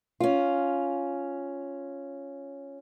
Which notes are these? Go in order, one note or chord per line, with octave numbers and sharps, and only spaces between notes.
C#4 F4